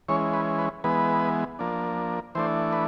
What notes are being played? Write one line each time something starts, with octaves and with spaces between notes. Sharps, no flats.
E3 G#3 C#4 C#5
B4
B4
E3 G#3 B3 B4
F3 A#3 D4
E3 A3 D4 C5
B4